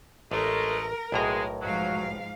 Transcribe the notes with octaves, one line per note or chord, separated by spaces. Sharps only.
A1 G#3 A3 A#4
B1 A2 G#3 A#5
G#2 F3 F#3 F5